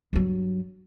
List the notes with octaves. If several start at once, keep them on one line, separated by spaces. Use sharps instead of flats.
G2 F#3